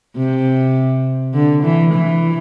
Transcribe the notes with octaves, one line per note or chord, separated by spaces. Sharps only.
C3
D3
E3
E3